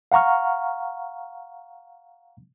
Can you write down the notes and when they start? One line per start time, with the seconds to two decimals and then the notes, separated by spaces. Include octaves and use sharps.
0.12 F5 F#5 A#5 C#6 F6